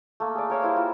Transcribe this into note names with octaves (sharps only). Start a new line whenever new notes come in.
A3 A#3
G#4 D5
A#4 C#5 E5 F5
G3 E4 C5
F4